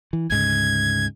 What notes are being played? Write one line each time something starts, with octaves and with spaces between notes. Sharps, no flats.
E3
D2 G#2 C#3 G#6